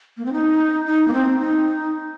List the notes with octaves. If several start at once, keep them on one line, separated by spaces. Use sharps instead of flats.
A#3
C4
D#4
D#4
A#3
C4
D#4